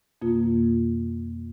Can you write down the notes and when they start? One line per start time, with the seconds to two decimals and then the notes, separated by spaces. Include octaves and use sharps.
0.22 F2 B2 A#3 F4